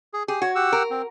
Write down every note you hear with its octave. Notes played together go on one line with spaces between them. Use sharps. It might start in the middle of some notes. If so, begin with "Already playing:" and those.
G#4
G4 G#4
F#4 C#5
G4 F#5 E6
A#4
C4